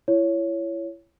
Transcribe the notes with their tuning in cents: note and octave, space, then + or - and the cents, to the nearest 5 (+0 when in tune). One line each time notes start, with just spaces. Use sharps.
E4 +30 C#5 +5